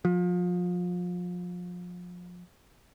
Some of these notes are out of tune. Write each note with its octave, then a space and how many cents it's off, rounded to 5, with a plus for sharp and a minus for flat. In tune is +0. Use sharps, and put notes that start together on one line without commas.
F3 +30